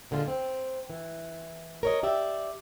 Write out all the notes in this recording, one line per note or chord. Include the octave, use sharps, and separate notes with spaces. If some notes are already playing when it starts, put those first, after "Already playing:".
A#2 D3 G#3 F4
C4
E3
A#4 C#5 D#5
G4 D5 E5